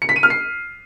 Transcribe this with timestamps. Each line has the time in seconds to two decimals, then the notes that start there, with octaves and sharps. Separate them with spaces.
0.02 C#7
0.09 B6
0.16 D#7
0.23 F6
0.30 C7